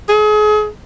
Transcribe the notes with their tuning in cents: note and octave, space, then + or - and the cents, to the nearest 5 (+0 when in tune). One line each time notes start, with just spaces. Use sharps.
G#4 +35